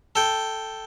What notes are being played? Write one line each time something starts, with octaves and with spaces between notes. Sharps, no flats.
A4 G5